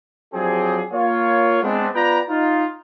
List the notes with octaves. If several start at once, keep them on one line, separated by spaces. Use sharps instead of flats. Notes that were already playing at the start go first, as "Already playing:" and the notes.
F3 F#3 C4 D4 G4 G#4
A#3 F4 C#5
G#3 B3 C4 D4
B3 F4 B4 D5 G5 A#5
D#4 F4